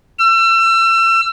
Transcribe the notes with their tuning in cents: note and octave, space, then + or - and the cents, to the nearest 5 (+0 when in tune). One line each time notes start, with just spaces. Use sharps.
E6 +35